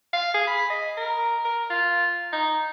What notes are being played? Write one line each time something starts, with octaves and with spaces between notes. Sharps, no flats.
F5
G#4
B5
D#5
A#4
A#4
F4
D#4